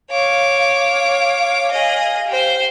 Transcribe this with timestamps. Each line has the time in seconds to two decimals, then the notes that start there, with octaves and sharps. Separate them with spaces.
0.11 C#5 F5 D6
1.71 G#4 D#5
2.28 G4 C5